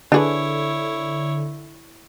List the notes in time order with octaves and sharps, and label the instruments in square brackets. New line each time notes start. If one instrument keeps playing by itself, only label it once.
[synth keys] D3 [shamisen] D4 G#4 B4 [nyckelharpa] E4 C#5